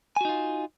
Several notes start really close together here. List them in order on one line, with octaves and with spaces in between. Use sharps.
G#5 F#4 D#4 F4